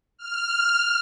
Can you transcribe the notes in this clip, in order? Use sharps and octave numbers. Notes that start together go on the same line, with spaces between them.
F6